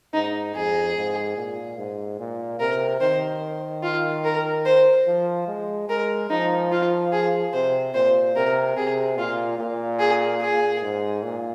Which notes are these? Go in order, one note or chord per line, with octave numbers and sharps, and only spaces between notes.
G#2 D#4
F2 G#4
G#2
A#2
G#2
A#2
C3 A#4
D#3 C5
F4
A#4
C5
F3
G#3
G#3 A#4
F3 D#4
F4
G#4
C3 C5
A#2 C5
C3 A#4
C3 G#4
A#2 F4
A#2
G#4
G#4
G#2
A#2